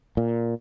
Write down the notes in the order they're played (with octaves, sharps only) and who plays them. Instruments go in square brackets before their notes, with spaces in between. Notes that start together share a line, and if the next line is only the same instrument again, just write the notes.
[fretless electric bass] A#2